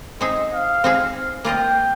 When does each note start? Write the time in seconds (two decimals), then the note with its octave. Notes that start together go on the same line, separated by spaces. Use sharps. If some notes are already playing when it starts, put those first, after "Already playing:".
0.21 C4 D#4 G#4 D#5
0.52 F5
0.84 C4 D#4 G#4
1.45 A#3 F4 A#4 D#5 G5